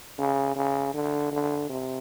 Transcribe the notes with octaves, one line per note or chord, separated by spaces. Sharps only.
C#3
C#3
D3
D3
C3